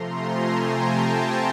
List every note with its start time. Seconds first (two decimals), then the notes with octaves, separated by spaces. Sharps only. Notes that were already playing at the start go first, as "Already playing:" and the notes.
Already playing: C3 F3 A3 A#5 C6
0.14 G#5 A#5
0.55 G5 A5